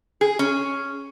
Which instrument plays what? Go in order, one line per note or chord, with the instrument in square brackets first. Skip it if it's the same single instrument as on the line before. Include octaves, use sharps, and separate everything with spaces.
[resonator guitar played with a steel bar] G#4
C#4